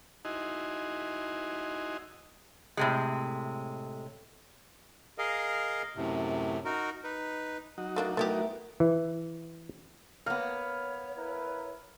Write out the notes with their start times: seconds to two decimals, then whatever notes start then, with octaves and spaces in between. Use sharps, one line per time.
0.25 D#4 E4 F#4 D#5 G#5 C6
2.77 A2 C3 G#3
5.18 G#4 A#4 D#5 F5
5.95 F#2 A2 C3
6.65 D#4 F#4 A#4
7.04 D#4 B4
7.78 F#3 D#4 F#4
7.96 A3 A#3 D4
8.17 A3 B3 E4 G4 A#4
8.80 E3
10.26 A#3 B3 C#5 F6
11.16 E4 A#4 B4